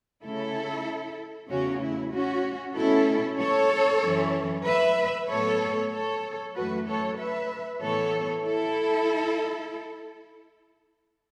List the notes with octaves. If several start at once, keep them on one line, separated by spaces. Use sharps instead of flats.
C#3 A3 C#4 E4 A4
E2 C#3 A3 C#4 F#4
E4
C#4 F#4
B2 A3 C#4 E4 A4
A4 C#5
F#2 E3 C#4
B4 E5
A2 F#3 B3 A4 C#5
A4 C#5
F#2 E3 A3 F#4 B4
A4 C#5
B4 E5
A2 E3 B3 A4 C#5
E4 A4